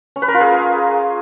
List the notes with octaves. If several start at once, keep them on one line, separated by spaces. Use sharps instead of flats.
C#4
B4
A#4
F4
G#4